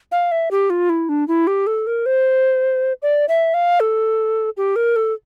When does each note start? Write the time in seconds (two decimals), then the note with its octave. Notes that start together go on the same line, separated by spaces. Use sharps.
0.12 F5
0.32 E5
0.51 G4
0.70 F4
0.89 E4
1.09 D4
1.28 E4
1.47 G4
1.67 A4
1.87 A#4
2.06 C5
3.02 D5
3.28 E5
3.54 F5
3.80 A4
4.57 G4
4.76 A#4
4.96 A4